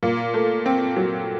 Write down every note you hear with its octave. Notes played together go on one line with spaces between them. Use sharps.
A#2
A3
C4
F#3